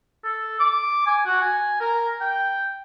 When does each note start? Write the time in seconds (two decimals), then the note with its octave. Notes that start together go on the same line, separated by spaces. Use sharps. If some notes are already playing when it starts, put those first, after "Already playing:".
0.24 A4
0.60 D6
1.06 G#5
1.25 F#4
1.42 G#5
1.80 A#4
2.21 G5